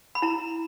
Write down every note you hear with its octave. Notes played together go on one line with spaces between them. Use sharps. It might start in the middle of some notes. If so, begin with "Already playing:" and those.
B5
E4 A#5